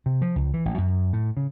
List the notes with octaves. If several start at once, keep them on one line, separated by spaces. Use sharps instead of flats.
C3
F3
C#2
E3
A1
F#2
A2
C#3